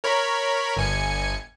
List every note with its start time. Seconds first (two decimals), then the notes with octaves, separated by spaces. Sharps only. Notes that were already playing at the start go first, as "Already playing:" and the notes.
0.04 A#4 C#5 B5
0.77 G1 G#5 C#7